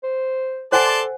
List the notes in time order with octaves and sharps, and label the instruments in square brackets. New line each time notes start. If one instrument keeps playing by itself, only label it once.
[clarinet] C5
[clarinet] A4 [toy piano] C5 F#5 G#5 [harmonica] D5 A5 C6